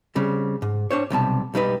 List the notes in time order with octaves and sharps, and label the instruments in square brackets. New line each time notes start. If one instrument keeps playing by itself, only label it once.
[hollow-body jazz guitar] C#3 G3 C4
G#2
D4 C5 C#5
B1 C3 G3 A5
B1 G3 D#4 B4